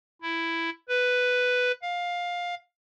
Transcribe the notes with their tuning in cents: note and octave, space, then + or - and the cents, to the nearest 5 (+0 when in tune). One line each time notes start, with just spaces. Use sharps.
E4 +5
B4 +5
F5 +15